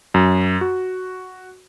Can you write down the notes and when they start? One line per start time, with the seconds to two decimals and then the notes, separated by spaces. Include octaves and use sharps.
0.14 F#2
0.61 F#4